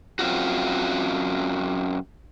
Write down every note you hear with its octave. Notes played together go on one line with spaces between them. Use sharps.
F#2 C4 F4 F#4